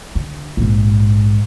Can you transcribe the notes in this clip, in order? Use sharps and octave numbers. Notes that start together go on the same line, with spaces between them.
D3
A#1 G#2